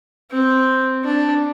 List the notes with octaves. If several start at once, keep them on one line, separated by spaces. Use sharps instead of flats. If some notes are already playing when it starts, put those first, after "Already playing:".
C4
D4